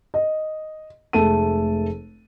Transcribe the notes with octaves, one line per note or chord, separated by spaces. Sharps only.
D#5
F1 G#3 A3 A4 A5 D#7